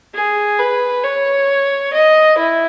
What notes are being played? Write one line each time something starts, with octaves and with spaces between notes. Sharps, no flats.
G#4
B4
C#5
D#5
E4